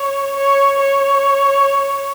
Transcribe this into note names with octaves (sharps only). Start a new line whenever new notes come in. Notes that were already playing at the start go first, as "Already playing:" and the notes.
Already playing: C#5
C#5
C#5